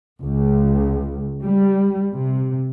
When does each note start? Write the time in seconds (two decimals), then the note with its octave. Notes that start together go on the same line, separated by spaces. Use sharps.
0.23 C#2
1.43 G3
2.12 C3